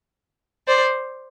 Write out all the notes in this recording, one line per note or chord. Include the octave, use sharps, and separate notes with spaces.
C5 D5